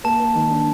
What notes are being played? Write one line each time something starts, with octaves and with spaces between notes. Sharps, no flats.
A#3 A5
A#3
D#3
D4